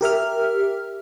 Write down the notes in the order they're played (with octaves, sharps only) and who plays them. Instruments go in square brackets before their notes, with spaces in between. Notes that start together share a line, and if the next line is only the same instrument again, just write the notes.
[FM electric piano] G4 A#4 E5 F6